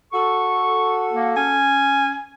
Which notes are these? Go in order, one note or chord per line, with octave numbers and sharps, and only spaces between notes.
F#4 A4 C#6
A#3
C#4 G#5